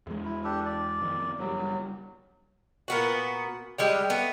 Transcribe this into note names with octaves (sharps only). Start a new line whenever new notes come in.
E2 G#3
E4
D4 G4 A4
D5
F2 D#3
F#1 A2 F#3 G3
A#2 B3 F#4
G3 G#3 G4
A3 B3